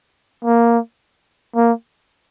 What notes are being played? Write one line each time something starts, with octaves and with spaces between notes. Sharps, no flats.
A#3
A#3